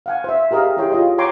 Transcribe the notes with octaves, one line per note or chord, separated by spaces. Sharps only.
F5 F#5 G#5
C5 E5
G4 G#4 A#4 D#5 F5
E4 G4 G#4 C#5 G5 C6
F4 D#5 C6
C#5 G5 G#5 A#5 C6 D6